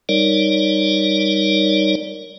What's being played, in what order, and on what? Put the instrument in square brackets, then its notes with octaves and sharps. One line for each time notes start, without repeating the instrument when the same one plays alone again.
[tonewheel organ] G3 D#4 A#4 C#5 D5